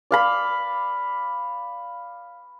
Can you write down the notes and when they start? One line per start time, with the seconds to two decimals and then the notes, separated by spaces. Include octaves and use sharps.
0.11 D5 F5 B5